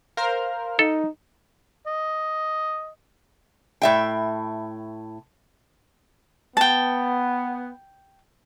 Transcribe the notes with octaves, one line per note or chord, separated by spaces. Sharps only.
A#4 C5 F5 F6
D#4 A4
D#5
A2 E5 G5
B3 G5 A5